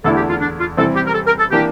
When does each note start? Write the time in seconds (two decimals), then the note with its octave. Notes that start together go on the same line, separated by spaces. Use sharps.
0.04 E2 D3 A3 E4 A4
0.17 G4
0.29 F4
0.41 D4
0.60 F4
0.77 C3 E3 G3 C4 E4 A4
0.96 G4
1.07 A#4
1.15 A4
1.27 A#4
1.39 A4
1.51 E3 A#3 D4 G4